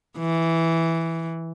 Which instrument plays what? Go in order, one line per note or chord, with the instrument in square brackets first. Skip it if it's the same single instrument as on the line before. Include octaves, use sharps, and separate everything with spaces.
[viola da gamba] E3